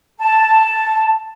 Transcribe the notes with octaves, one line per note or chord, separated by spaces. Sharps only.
A5